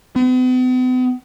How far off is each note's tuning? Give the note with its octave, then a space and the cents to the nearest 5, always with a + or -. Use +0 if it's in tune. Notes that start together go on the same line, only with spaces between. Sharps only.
B3 +45